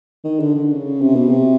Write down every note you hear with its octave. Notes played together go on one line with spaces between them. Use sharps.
D#3
D3
D3
C#3
C3
B2
C3